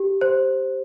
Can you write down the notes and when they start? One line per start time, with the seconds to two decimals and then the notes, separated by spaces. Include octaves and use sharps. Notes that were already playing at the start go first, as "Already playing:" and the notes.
Already playing: G4
0.21 C5